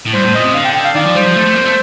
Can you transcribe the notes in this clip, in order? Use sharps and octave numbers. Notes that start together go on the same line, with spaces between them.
A2
G2 C5
A2
A#2 D#5
C3
D3 F5
G5
G5
F5
D#3 D5
F3
G3 C5
F3
A3
A3
A#3
A3